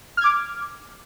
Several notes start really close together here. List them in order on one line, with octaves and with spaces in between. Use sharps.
F6 G#6 D6